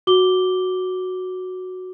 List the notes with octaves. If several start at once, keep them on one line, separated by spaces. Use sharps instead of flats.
F#4 D6 G7